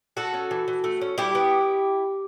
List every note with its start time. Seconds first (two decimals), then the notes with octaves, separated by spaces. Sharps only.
0.17 A3 F#4 A4
0.34 C#4
0.51 E3
0.68 E3
0.84 A3
1.01 C#4
1.18 G3 E4 G4
1.35 B3